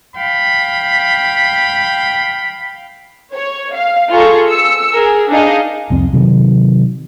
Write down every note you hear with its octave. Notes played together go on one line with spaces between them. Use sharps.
F5 G5 B5
C#5
F5
F4 G#4 A4 A#5 C#6
E6 C#7
G#4 A#4
D4 D#4 G#4 D#5 F5
C2 F2 C4
C3 D#3 F#3